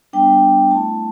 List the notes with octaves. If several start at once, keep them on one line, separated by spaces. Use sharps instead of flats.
G3 B3 D4 G5
A3 E4 A5